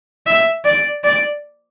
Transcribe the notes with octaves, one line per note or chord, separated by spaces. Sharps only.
E5
D5
D5